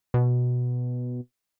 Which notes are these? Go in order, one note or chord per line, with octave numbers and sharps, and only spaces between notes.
B2